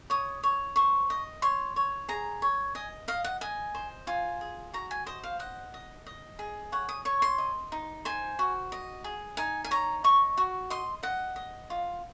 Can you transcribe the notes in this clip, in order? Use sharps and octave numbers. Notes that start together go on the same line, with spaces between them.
C#5 D#6
C#5
C5 C#6
D#5
C#5 C6
C#5
G#4 A#5
C#5
D#5 G#5
D#5 F5
F#5
D#5 G#5
C5
F4 G#5
G#4
F#4 A#5
G#5
C5 D#5
F5
D#5 F#5
D#5
D#5
G#4
C#5 F#5
D#6
C#5 C#6
C6
D#5
D#4
C5 G#5
F#4
D#5
G#4
D#4 G#5
G#5
C#5 A#5
D#5 C#6
F#4
D#5 C6
D#5 F#5
D#5
F4